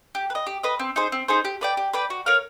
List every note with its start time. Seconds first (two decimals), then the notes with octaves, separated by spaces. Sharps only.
0.15 G4
0.30 B4
0.35 D#5
0.47 G4
0.63 B4 D#5
0.79 C4
0.96 D#4 G#4 C5
1.12 C4
1.28 D#4 G#4 C5
1.45 G4
1.61 B4 D5 G5
1.77 G4
1.93 B4 D5 G5
2.10 F#4
2.26 A#4 C#5 F5